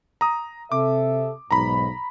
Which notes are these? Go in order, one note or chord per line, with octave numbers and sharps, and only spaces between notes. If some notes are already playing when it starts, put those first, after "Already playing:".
A#5 D#6
C3 A4 E5 D6
B1 G#2 A#5 B5